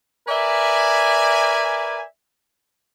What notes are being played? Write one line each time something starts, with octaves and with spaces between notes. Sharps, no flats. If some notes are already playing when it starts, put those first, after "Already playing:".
A#4 B4 D5 E5 G#5